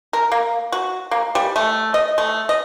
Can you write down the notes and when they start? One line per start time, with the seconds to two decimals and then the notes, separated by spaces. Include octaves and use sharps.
0.13 A#4
0.32 A#3
0.72 F#4
1.11 A#3
1.35 G3
1.56 A3
1.94 D#5
2.18 A3
2.49 D#5